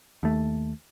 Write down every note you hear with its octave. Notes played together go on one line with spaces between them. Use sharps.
D#2 A3